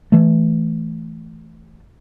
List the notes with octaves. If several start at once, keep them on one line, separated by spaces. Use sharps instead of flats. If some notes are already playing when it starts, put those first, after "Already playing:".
E3 A3